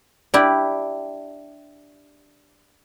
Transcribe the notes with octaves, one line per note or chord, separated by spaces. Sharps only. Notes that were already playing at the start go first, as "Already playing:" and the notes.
D4 E4 G4